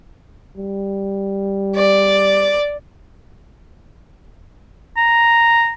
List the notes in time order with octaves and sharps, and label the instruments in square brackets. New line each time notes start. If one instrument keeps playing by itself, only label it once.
[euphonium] G3
[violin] D5
[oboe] A#5